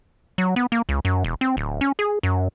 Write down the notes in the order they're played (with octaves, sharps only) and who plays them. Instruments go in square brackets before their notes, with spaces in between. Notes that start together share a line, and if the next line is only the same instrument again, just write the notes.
[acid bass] F#3
B3
A#3
C#2
F#2
E1
C4
D1
C#4
G#4
F#2